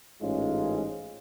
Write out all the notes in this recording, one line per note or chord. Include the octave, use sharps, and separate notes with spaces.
A1 G#2 G#3 C#4 F4